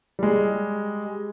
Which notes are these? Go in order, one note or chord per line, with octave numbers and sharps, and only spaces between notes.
G3 G#3